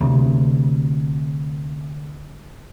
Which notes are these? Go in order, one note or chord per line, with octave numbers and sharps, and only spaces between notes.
D2 C3